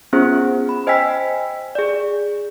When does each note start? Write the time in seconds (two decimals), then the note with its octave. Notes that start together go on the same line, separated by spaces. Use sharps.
0.13 B3 C#4 F4 G#4 C5
0.69 B5
0.87 C5 D#5 G5 G#5 E6 B6
1.75 G#4 D5